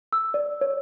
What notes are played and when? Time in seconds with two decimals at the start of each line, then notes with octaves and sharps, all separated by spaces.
0.13 E6
0.34 D5
0.61 C#5